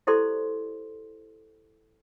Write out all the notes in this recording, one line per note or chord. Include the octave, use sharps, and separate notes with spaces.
E4 G4 A4 C5 D5 C6